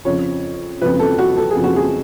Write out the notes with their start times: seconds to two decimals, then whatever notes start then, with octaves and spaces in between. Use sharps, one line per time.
0.05 F2 C#3 F3 C#5
0.81 F2 C#3 F3 B4
0.99 A4
1.18 F#4
1.37 A4
1.51 G#4
1.56 F2 C#3 F3
1.64 F#4
1.76 G#4